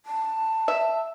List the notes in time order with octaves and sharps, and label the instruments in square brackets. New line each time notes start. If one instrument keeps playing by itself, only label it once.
[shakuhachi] A5
[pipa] E5